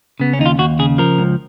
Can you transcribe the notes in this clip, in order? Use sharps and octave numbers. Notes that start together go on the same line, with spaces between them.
C#3 B3
C#4
D#2 D#4
F4
D#2 F#4
C#3 G#4
F3 A#4
C#2